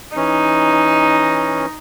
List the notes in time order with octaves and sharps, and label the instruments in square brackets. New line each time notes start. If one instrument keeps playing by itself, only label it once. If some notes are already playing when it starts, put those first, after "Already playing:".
[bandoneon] E3 C#4 [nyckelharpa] D#4